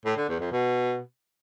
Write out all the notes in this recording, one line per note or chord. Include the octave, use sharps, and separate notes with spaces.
A2
D3
E2
F2
B2